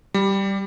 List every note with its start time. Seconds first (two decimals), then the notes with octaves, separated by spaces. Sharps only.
0.14 G3